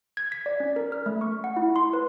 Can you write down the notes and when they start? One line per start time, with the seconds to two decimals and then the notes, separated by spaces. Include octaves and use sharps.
0.17 G#6
0.32 B6
0.46 D5
0.60 C#4
0.76 A#4
0.92 F6
1.06 A3
1.21 C#6
1.44 F#5
1.57 E4
1.76 C6
1.93 B4